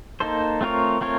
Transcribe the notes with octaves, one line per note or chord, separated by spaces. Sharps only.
A#3 D#4 A4 C5
A3 C4 F4 A#4 C#5
A3 C4 F4 A#4 C#5